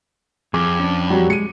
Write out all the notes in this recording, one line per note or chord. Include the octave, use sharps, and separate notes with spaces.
F2 G#4 D6
C#4 D4
F#3 G3 F#4
G#3 C#7 D#7